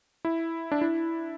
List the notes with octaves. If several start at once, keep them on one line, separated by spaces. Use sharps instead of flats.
E4
D4
E4